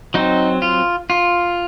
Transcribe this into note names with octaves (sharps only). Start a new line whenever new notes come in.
F#3 C4 D#4
F4
F4